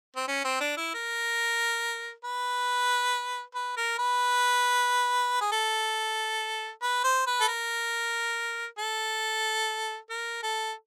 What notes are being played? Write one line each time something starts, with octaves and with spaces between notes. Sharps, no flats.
C4
C#4
C4
D4
E4
A#4
B4
B4
A#4
B4
G#4
A4
B4
C5
B4
A4
A#4
A4
A#4
A4